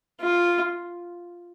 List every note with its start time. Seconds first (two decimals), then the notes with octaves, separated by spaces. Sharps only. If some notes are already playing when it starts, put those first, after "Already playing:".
0.20 F4